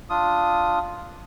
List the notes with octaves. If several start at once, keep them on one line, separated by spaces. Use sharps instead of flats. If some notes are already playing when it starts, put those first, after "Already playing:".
D4 F4 D#6